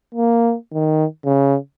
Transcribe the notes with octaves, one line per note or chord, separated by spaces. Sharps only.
A#3
D#3
C#3